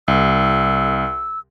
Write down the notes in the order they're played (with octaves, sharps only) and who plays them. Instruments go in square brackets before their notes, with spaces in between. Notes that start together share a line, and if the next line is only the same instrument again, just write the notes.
[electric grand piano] C2 [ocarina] E6